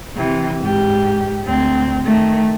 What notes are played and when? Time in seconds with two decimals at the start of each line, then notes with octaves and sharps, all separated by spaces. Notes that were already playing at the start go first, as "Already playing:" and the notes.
0.17 C3 E3
0.61 G#2 G4
1.45 D2 C4
2.05 D#3 A3